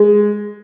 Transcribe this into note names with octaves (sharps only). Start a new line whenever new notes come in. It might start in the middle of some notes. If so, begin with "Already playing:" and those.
Already playing: G#3